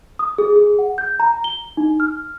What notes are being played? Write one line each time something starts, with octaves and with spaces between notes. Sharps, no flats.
D#6
G#4
G#4
F#5
G6
A#5
G7
D#4
F6